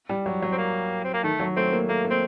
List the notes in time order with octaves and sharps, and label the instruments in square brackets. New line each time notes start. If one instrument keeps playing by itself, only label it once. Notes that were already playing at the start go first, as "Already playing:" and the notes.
[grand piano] G3
F#3
F#3
[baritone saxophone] C4
A#3
C4
A#3
[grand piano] D#3 [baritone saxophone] A3
[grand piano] F#3
[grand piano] A3 [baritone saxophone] C4
[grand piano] A#3
[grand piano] A3 [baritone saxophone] A#3
[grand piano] A#3
[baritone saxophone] C4